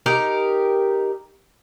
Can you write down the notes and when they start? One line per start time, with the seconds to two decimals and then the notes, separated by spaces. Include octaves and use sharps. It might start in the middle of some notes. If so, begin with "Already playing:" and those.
0.06 D#4 G4 A#4